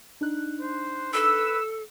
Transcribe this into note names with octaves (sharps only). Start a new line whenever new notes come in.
D4 D#4 F#6
C5
A4 B4 E6